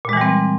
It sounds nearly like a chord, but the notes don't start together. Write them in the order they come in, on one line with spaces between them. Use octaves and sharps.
A#2 G#3 E3 G3 C4